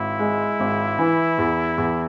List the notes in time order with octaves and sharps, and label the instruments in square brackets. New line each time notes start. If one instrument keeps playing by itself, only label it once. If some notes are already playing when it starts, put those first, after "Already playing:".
Already playing: [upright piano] G#1 [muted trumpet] E4
[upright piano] G#3
G#1
E3
E2
E2